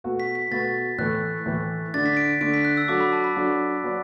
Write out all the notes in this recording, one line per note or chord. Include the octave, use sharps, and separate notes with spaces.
B2 A3 F#4 B4
B6
B6
B2 A3 F#4 B4 A6
A2 E3 A3 F#6
A2 E3 A3
D3 A3 D4 A6
B6
D7
D3 A3 D4 D7
B6
F#6
E6
F#3 D4 F#4 A4 D6
B5
A5
B5
F#3 D4 F#4 A4
F#3 B3 F#4 B4 D5